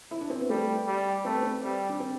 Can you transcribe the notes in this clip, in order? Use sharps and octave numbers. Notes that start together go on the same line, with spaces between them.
E4
D4
C4
B3
G3 A3
G3
A3 C4
B3
C4
G3
D4
C4